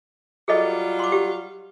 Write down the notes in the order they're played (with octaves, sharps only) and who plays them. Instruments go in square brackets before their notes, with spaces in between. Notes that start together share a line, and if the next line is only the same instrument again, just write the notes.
[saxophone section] F#3 G3 F4 [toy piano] G#4 A4 D#5
[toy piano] C6 D6
G4